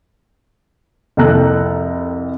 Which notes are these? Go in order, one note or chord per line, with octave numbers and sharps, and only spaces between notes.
C2 F2 A4 G5 A#5 F#6